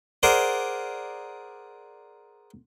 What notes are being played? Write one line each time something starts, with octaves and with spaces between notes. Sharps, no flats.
G#4 A#4 C5 D5 F#5